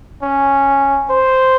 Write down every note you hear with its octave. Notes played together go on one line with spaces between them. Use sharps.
C#4
C5